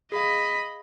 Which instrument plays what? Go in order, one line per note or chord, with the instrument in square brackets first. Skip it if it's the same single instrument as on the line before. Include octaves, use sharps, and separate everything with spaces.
[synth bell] G#4 F5 [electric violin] D#5 B5